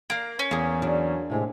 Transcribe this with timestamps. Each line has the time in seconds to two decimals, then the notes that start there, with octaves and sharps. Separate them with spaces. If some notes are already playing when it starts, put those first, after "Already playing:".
0.10 A#3 A#4 F5
0.39 C#4
0.51 E2 A#3 G#4
0.82 F#3 D4
1.30 A2 C3 G#3